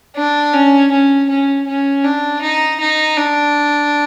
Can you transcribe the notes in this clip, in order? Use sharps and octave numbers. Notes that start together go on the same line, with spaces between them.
D4
C#4
C#4
C#4
C#4
D4
D#4
D#4
D4